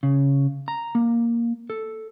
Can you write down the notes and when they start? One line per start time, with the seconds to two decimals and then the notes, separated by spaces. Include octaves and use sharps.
0.03 C#3
0.68 A#5
0.95 A#3
1.70 A4